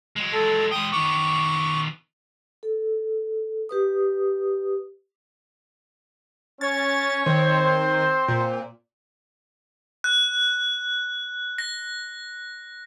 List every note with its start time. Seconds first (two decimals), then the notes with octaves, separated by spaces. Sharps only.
0.16 F#3 G#3
0.33 A4
0.71 G#3 G5 D#6
0.92 D#3 B3 C#6 D6
2.63 A4
3.69 G4 B4 D#6
6.61 C#4 C#5 A6
7.26 D#3 C4 C5
8.28 A#2
10.04 F#6
11.58 A#6